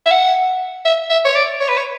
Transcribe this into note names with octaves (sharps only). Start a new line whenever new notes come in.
E5
F#5
E5
E5
C#5
D5
C#5
B4
C#5